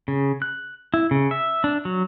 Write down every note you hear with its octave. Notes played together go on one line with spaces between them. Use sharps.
C#3
F#6
E4
C#3
E5
D4
F#3